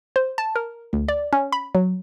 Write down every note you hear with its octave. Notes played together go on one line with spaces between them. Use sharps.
C5
A5
A#4
D2
D5
C#4
B5
F#3